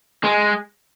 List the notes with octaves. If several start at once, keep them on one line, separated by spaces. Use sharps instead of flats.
G#3